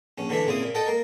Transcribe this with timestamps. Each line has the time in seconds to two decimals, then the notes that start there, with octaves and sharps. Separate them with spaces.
0.18 A#1 C#4
0.29 D3 E3 A3 D4 E5
0.46 A#2 C#3 C4 E4 D#6
0.62 A#2
0.75 A4 D#5 F#5 G5 A5
0.86 A#3 A#4